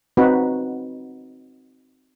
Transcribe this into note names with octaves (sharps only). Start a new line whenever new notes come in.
C4 D#4 F#4 B4